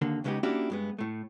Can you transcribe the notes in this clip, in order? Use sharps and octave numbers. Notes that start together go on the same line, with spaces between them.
D#2 D3 A#3
C#2 C#3 G#3 B3 D#4 G4
A#3 C#4 D4 E4 F#4 G4
G2 G#3 B3
A2 A3